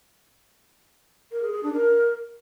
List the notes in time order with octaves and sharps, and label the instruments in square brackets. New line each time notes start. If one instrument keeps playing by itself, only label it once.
[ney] A#4
G#4
G#4
D4
A#4